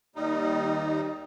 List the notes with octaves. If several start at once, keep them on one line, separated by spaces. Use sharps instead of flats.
D#2 G3 D#4